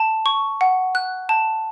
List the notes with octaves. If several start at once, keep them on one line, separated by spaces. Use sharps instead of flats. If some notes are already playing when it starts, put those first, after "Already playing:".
Already playing: A5
C#6
F#5
F#6
A5